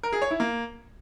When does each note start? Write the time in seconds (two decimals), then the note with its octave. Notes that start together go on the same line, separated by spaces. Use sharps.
0.03 A#4
0.13 G#4
0.22 C#5
0.31 E4
0.40 A#3